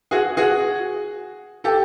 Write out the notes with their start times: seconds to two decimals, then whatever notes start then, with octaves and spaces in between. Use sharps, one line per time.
0.11 F#4 G#4
0.37 F#4 G#4
1.64 G4 A4